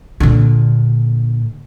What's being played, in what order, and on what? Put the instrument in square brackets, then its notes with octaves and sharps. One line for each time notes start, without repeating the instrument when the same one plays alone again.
[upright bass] A#2 D3